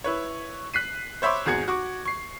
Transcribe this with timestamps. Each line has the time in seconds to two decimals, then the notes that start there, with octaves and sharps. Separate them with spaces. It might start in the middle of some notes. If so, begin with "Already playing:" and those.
0.04 E4 B4 C#5
0.74 F#6 B6 C7 D#7
1.22 C5 C#5 E5 B5 C6 D6
1.46 G#1 E2 F#4 G#4 G#6 C#7
1.68 F#4 C#6 D6
2.06 C#6 C7